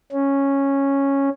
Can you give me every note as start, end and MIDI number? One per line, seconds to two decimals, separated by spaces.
0.13 1.30 61